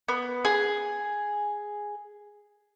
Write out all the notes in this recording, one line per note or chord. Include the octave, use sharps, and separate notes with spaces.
B3
G#4